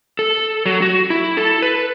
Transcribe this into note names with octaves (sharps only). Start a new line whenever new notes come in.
A4
F#3
F#4
E4
A4
B4